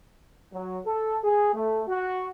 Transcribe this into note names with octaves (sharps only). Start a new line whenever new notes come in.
F#3
A4
G#4
A3
F#4